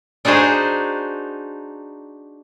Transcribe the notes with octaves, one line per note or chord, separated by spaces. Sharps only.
D4 D#4 F#4 G#4 C5